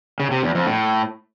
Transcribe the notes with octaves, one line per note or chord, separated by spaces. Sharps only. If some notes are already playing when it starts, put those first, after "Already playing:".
C#3
C3
E2
F2
A2